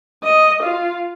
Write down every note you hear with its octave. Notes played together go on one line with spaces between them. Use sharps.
D#5
F4